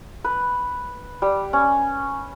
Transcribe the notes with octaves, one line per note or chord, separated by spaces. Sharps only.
B4
G3
C#4